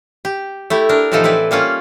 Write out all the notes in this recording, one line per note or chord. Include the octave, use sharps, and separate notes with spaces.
G4
A3 E4 G4
D4 A#4
A2 C3 E3 F3 D#4 A4
C4 E4 B4 D5
G3 A#3 C#4 F4